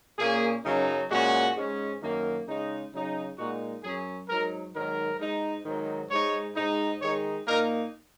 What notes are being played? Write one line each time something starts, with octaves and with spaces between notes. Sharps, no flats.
A#2 A#3 C#4 G#4
F#2 C#3 F#3 D#4
A#2 G#3 C#4 F#4
G#2 G#3 C#4
F#2 D#3 A#3
C#3 G#3 D#4
C#3 F#3 D#4
A#2 G#3 D#4 F#4
F#2 F#3 C#4 G#4
G#2 F#3 D#4 A#4
G#2 D#3 F#3 A#4
G#2 G#3 D#4
G#2 D#3 F#3 D#4
G#2 G#3 D#4 C#5
G#2 G#3 D#4
D#3 G#3 D#4 C#5
A#2 A#3 D#4 A#4